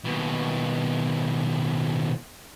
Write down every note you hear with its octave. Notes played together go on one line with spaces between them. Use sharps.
D#2 B2